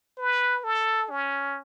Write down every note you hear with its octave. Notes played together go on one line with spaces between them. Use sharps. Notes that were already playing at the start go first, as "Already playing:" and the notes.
B4
A4
C#4